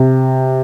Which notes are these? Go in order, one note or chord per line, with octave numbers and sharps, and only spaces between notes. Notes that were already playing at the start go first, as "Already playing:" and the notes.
Already playing: C3